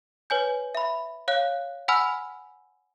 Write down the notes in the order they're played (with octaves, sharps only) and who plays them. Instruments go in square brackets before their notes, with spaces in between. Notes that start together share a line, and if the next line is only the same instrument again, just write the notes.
[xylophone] B4 C#5 G#5 G6
E5 B5
C#5 F5 F#6
F#5 G#5 B5 E6 F6